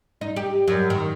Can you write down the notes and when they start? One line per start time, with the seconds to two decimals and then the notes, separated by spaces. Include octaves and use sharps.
0.21 D#4
0.36 G4
0.68 F#2
0.90 D#3